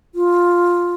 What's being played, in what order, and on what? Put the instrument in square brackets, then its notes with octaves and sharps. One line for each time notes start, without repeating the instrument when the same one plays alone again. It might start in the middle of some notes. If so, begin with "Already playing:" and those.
[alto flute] F4